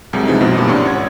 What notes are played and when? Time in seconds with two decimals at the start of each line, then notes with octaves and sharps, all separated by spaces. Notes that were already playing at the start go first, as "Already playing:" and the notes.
0.13 C2 F#2 C3 G#3
0.26 E3 F3 G#3 C4 D#4
0.40 B1 F#2 B2 F3
0.55 D2 G2 A#2 E3 D#6
0.68 C2 G2 C#4 D4 C6
0.85 G#1 C#5 F#5 G#6